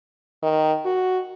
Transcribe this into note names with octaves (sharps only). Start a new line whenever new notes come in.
D#3
F#4